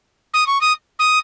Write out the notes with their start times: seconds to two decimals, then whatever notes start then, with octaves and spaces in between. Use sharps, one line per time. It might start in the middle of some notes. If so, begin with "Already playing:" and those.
0.34 D#6
0.47 C#6
0.61 D#6
0.99 D#6